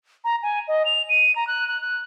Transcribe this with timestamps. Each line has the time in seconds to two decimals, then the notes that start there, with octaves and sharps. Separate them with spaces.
0.24 A#5
0.43 G#5
0.68 D#5
0.85 F7
1.09 D#7
1.36 A#5
1.47 F#6
1.67 F#6
1.81 F#6